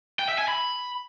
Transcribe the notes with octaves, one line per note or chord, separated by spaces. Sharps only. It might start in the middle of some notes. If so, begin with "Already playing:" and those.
G5
E5
G#5
B5